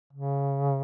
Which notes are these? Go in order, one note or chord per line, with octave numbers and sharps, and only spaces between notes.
C#3